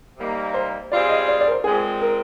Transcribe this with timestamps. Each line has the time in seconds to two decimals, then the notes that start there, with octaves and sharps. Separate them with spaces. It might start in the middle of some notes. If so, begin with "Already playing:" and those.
0.17 C3 G3 A#3 D#4
0.54 C5
0.91 G3 C4 F4 G#4 D5
1.09 D#5
1.28 D5
1.41 D5
1.47 A#4
1.52 C5
1.64 A#2 G#3 C4 G#4
2.01 A#4